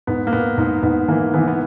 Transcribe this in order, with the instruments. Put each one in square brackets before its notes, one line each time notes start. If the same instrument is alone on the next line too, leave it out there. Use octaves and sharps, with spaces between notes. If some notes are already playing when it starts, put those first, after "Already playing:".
[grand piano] G#2 B3
A#3
G#2 B3
G#2
G#2 B3
E3 A#3
E3 B3
B3